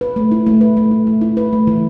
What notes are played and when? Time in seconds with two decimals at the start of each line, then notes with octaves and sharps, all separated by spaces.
0.01 B4
0.16 A3
0.32 E4
0.46 A3
0.61 B4
0.77 A3
0.91 E4
1.07 A3
1.21 E4
1.37 B4
1.53 A3
1.67 E3